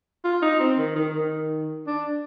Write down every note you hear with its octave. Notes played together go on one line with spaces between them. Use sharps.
F4
D#4
C4
D#3
D#3
D#3
D4